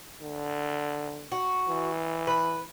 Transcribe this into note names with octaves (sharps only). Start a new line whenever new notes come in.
D3
F#4
E3
B4